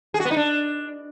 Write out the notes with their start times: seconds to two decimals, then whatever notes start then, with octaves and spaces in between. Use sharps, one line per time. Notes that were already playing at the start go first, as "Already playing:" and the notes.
0.14 G#4
0.20 F#4
0.25 B3
0.31 D#4
0.37 D4